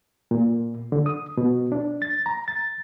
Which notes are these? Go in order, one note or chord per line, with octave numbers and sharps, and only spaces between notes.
A#2
D3
D#6
B2
D4
A6
A#5
A6